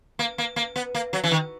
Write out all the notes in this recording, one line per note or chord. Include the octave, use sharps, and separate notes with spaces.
A#3
A#3
A#3
B3
A#3
F#3
E3
D#3